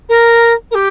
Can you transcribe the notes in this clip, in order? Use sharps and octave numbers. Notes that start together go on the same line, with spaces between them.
A#4
A#4
G4